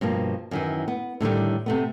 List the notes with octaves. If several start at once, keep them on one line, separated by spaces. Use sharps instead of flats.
G2 B2 F3 A#3
F#2 D#3 E3
B3
A2 D3 D#3 G3
C3 A3 B3